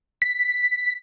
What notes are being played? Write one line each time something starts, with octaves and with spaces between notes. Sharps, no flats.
B6